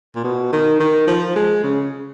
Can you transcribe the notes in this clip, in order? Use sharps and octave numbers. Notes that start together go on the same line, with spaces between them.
A#2
B2
D#3
D#3
F3
G#3
C#3